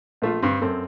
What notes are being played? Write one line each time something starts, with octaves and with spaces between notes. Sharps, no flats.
A#1 A3 F4
G2 C4
F#2 C4 A4